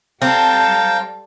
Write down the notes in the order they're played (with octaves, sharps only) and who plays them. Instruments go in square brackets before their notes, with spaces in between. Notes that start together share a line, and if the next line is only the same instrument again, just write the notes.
[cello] G3 [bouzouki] C4 [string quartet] A4 A5 [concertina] F5 G5 A#5